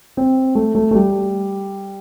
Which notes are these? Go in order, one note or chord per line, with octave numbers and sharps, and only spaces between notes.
C4
A3
A3
A3
G3